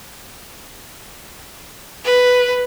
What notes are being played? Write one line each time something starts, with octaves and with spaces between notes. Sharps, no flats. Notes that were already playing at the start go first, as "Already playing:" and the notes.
B4